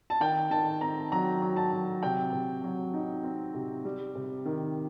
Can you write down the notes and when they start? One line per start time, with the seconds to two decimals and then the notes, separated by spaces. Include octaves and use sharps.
0.10 A5
0.20 D#3 G5
0.50 D#3 A5
0.81 C4 A#5
1.12 F#3 A#5
1.42 F#3
1.56 A5
1.72 F#3
2.03 C3 G5
2.33 C3
2.64 F#3
2.94 D#4
3.23 C4
3.54 C3
3.85 G3
4.15 C3
4.45 D#3